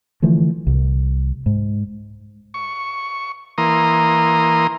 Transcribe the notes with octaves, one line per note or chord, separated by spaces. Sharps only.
D3 E3 F3 A3
C2
G#2
C#6
E3 A#3 A#5 C6 D#6